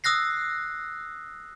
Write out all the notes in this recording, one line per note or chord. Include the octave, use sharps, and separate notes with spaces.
D#6 E6 F#6 A#6 C7